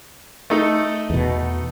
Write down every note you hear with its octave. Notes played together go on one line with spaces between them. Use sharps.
A3 D#4 A4
E2 B2